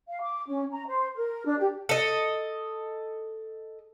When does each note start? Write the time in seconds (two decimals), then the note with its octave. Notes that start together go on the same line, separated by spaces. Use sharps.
0.08 F5
0.21 D6
0.48 C#4
0.72 A#5
0.87 C5
1.16 A#4
1.46 D4
1.60 G4
1.89 A4 D#5